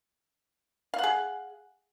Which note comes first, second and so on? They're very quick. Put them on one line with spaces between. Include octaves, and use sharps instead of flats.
F5 F#5 G#4